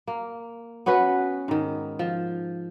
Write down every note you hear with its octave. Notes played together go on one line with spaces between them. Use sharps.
A#3
B3 C#4 F#4 B4
G#2 D#3
F3